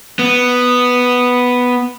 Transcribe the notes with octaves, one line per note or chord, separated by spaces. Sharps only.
B3